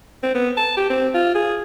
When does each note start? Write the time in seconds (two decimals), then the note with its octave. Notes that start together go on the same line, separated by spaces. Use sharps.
0.23 C4
0.35 B3
0.57 A5
0.77 G4
0.90 C4
1.14 F4
1.35 G#4